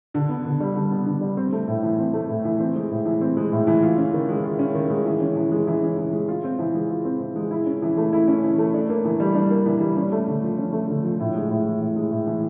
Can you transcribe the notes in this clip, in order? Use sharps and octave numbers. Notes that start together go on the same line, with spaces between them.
D3
B3
D3
G3
D3
B3
D3
G3
C4
A3
A2
E3
C4
A3
A2
E3
C4
G#3
A2
E3
C4
G#3
A2
E3
F4
C#4
D#3
G#3
F4
C#4
D#3
G#3
E3
C#4
E3
G#3
E3
C#4
E3
G#3
F4
C4
E3
G#3
F4
C4
E3
G#3
E4
C#4
E3
A3
E4
C#4
E3
A3
D4
A#3
E3
G3
D4
A#3
E3
G3
C#4
A3
D3
F3
C#4
A3
D3
F3
A2
G#3
A2
E3
A2
G#3
A2
E3